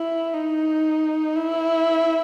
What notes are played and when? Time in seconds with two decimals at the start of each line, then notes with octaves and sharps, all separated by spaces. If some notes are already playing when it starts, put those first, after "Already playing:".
Already playing: E4
0.34 D#4
1.36 E4